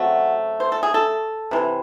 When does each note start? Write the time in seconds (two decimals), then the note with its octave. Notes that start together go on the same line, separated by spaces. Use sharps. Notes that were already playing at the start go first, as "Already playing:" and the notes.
Already playing: C#3 F#3 A3 C4 F#4
0.60 C5
0.72 A4
0.83 G#4
0.94 A4
1.51 C3 E3 C4